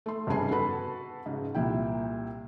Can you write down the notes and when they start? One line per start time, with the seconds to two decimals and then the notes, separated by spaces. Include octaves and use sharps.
0.06 A3 C6
0.27 F1 G2 C#3 B3 G#5 C7
0.51 F#4 A4 B4 A5 B5
1.26 G#2 C#3
1.55 C2 A#2 E4 G5